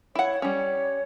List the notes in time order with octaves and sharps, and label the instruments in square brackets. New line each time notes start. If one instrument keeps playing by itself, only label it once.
[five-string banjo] E4 F#5 [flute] C#5
[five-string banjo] G3 C#4 [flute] C#5